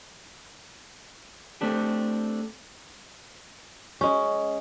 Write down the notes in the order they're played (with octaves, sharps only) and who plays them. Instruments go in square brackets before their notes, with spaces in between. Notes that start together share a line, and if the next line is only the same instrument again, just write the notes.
[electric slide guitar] A3 C4 D4 G4
[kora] G#3 C#4